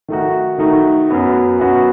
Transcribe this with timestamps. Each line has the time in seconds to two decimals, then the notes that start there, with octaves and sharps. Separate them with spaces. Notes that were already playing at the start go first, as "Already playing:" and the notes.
0.08 D#3 A3 D#4 F#4
0.58 D#3 A3 D#4 F#4
1.09 F#2 F#3 B3 F#4
1.60 F#2 F#3 B3 F#4